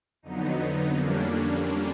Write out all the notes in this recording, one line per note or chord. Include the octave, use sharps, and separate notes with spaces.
F2 D3 F#3 B3 D#4
F2 D3 G3 A#3 C#4 D4